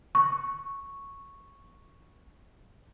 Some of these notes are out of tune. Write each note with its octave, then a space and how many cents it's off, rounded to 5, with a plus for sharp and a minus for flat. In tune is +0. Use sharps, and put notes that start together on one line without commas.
C#6 -5